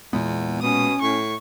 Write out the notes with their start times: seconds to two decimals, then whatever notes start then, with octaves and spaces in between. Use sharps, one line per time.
0.13 E2 A#2 G#3 B3
0.62 B2 C#4 D#6
1.01 A2 C#6